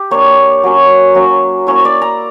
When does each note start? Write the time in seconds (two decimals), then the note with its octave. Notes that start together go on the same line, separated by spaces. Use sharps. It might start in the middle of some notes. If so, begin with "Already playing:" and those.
Already playing: G4
0.11 A#3 D4 C#5
0.63 F#3 A#3 C#4
1.15 F#3 A#3 C#4
1.67 A#3 C#4 E4 C#5
1.80 C#5 D5
2.02 A#5